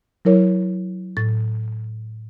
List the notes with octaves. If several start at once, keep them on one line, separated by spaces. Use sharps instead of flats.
F#3 E4 A#4 C#5
A2 A6